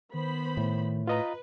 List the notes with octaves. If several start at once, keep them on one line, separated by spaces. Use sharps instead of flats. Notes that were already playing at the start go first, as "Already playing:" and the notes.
D#3 B3 C5 B5
A2
F4 B4 D#5 A#5